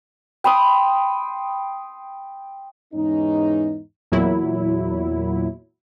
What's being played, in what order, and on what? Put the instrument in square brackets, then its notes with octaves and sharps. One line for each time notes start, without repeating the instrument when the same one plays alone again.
[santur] G5 B5 C6 D#6
[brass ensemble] E2 G#2 E3 C#4 D#4
[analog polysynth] E2 A#2 F#3 E4